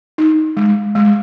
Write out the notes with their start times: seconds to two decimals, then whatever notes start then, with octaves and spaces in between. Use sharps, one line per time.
0.18 D#4
0.57 G#3
0.95 G#3